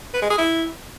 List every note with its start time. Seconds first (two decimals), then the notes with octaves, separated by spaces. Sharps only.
0.14 B4
0.22 G#3
0.30 G#4
0.38 E4